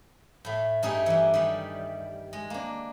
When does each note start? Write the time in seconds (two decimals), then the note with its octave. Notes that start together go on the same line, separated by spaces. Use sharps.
0.45 A2 A3
0.83 G2 A3 D#4 G#4 G5
1.06 E3 G3
1.34 D#3 G3
2.33 G#3
2.50 A#3 D4